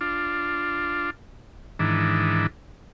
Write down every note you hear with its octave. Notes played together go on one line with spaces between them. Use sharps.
D4 F4
G#2 D#3 E3 D4